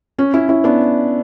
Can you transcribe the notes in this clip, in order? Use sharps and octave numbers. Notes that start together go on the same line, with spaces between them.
C#4
C#4 E4
C#4 E4
B3 D4